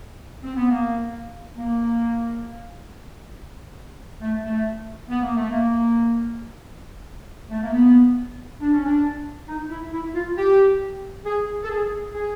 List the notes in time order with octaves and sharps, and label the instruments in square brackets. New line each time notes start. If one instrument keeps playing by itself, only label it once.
[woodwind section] C4
B3
A#3
A#3
A3
A3
B3
A#3
A3
A#3
A3
A#3
B3
D4
C#4
D4
D#4
E4
E4
F4
G4
G#4
A4
G#4
G#4